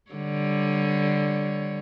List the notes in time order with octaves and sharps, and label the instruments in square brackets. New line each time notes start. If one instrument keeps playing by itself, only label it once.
[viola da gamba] D3 G3 C#5